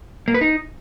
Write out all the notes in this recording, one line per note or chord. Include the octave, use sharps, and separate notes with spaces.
A#3
B4
D#4